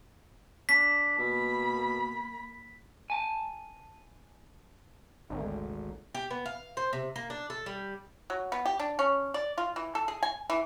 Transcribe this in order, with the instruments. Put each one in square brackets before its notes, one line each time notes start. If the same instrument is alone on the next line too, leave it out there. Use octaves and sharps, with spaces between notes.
[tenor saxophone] D4 [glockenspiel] B6
[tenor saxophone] B2 [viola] A#3 B5
[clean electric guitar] G#5 A5
[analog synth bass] G#1 [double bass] D2 D3
[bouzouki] G4
B3
F5
C5
C3
A#3
D4
A4
G3
[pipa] F#3
B3
G4
D4
C#4
D5
F4
E3
A4
G#4
G#5
E3